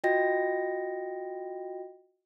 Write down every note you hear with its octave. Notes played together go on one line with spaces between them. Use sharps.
F4 F#4 D#5 G5 A#6